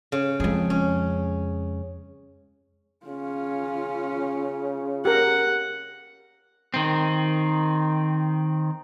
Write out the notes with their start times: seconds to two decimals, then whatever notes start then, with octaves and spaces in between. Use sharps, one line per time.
0.12 C#3
0.40 F2 G#3 G#4
0.70 C#4
3.06 C#3 C#4 F4
5.05 G4 A#4 F#5
6.74 D#3 C4